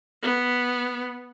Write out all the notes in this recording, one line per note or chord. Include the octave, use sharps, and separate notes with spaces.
B3